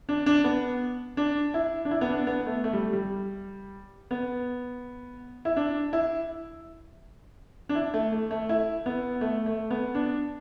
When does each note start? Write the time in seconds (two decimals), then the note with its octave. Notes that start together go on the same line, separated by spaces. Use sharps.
0.09 D4
0.26 D4
0.44 B3
1.17 D4
1.54 E4
1.85 D4
1.91 E4
2.01 B3
2.09 D4
2.27 B3
2.46 A3
2.64 A3
2.73 G3
2.93 G3
4.11 B3
5.45 E4
5.56 D4
5.93 E4
7.69 D4
7.75 E4
7.94 A3
8.13 A3
8.31 A3
8.49 E4
8.86 B3
9.21 A3
9.46 A3
9.71 B3
9.95 D4